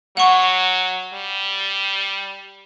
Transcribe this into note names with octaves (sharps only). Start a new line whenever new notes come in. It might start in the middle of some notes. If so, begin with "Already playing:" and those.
F#3 F#5 C#6
G3